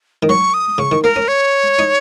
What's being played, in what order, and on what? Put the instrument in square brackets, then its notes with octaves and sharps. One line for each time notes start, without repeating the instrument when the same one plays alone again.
[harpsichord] D#3
[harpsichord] F#3 [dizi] C#6
[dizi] D#6
[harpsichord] C#3 [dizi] C#6
[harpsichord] D#3
[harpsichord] A#3 [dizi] A#4
[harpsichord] C#4
[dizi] C#5
[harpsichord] D#4